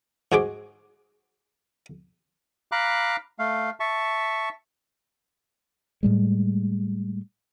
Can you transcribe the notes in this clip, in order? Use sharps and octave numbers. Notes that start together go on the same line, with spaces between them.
G#2 F#4 G#4 C5 D6
F5 A#5 B5 D6 F#6
A3 F5
E5 A5 C#6
A2 G3 G#3